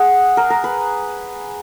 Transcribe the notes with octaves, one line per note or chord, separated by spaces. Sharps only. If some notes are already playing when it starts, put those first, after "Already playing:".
Already playing: G#4 F#5
A#4
A#4
B4